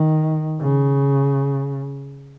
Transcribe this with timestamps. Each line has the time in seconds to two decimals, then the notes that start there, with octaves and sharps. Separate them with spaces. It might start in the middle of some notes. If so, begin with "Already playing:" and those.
Already playing: D#3
0.61 C#3